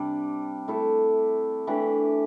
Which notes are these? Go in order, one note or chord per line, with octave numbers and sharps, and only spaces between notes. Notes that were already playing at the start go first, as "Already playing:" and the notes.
Already playing: C3 G3 D4
A3 E4 A4
E3 A3 D4 G4